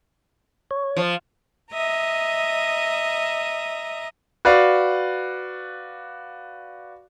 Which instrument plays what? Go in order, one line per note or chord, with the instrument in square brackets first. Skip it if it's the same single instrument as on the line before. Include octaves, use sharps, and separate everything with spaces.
[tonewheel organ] C#5
[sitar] F3
[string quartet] D#5 E5 A#5 D#6
[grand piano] F#4 B4 D5 F5